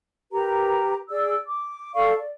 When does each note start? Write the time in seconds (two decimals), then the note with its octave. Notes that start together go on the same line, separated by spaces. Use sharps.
0.32 G4 A#4 B4 A#5
1.09 G#4 D5 E6
1.47 D6
1.94 A4 D5 F5 C#6
2.17 D5